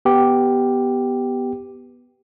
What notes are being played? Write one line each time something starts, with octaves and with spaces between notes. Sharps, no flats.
B3 G4